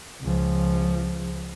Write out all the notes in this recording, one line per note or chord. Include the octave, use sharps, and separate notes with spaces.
C#2 F3